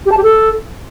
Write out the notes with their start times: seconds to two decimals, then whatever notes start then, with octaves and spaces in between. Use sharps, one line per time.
0.06 G4
0.12 A5
0.17 G4
0.23 A4